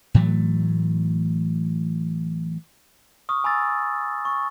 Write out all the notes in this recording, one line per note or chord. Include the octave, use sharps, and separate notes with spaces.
A2 E3 F#3 A3
C#6 D#6 F6
G#5 B5 E6 A6
C#6